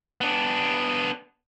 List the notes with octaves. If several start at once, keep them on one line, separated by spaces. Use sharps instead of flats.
B3 D4